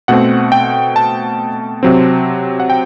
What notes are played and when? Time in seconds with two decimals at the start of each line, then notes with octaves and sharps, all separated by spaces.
0.08 B2 A3 C4 F#5
0.52 G5
0.96 A5
1.83 C3 F#3 C4
2.60 F#5
2.70 G5